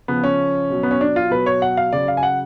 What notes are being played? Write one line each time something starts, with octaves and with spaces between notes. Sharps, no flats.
C#3 F3 B3
C#4
B2 F#3
B3
C#4
D4
F4
B2 F#3 B4
C#5
F#5
F5
C#3 F#3 D5
F5
G#5
F#5